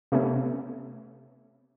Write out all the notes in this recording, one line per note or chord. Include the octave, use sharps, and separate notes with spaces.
C3 A3 B3 C#4